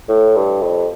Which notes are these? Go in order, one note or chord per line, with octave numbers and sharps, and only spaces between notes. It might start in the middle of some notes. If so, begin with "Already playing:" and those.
A2
G2
F2